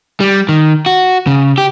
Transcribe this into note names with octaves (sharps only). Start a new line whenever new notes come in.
G3
D#3
F#4
C#3
G4